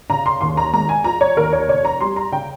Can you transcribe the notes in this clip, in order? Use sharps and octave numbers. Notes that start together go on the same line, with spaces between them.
C#3 A#5
C6
D#2 C6
A#5
G#3 A#5
G#5
F3 A#5
C#5
D#2 A#4
C#5
F1 C#5
A#5
G3 C6
A#5
C#3 G5